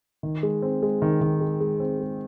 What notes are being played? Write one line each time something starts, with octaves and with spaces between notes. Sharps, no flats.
D#3
G#3
C4
G#3
D#3
D#3
G#3
G#3
C4
G#3